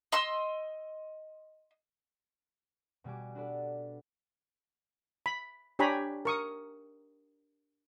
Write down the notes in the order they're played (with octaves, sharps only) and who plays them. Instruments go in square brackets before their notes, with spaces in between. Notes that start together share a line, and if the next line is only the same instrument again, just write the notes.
[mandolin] D#5 C6 E6
[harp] B2 G3 F#4 G#5 D6
D4 F#4 A4 B4 D5
[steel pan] B5
D4 G4 C#5 G#5 A#5 B5
A#4 C#6 D#6